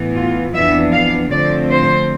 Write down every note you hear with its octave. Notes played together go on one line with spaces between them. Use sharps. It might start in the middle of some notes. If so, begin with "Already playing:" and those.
Already playing: A2 E3 B3
F4
F2 E3 B3 D4 E5
F5
D3 F3 A3 C4 D5
C5